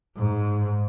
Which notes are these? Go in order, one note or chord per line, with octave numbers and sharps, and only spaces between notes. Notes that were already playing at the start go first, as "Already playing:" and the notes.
G#2